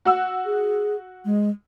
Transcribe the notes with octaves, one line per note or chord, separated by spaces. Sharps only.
F#4 F#5 E6
G#4
G#3